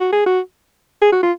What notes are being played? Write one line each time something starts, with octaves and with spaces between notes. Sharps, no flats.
F#4
G#4
F#4
G#4
F#4
F4